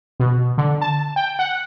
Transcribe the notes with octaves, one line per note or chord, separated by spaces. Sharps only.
B2
D3
A5
G5
F#5